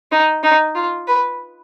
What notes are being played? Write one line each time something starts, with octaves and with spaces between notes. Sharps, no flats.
D#4
D#4
F4
B4